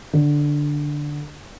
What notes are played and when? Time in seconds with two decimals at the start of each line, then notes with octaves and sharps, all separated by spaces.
0.13 D3